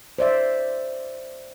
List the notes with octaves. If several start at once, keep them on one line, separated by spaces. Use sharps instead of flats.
C5 D5 E5